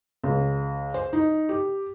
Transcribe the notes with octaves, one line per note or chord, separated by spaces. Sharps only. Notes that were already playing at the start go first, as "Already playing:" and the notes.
C#2
C5
D#4
G4